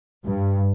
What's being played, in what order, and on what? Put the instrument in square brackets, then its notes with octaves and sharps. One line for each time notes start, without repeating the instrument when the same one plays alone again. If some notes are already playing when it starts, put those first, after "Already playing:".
[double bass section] G2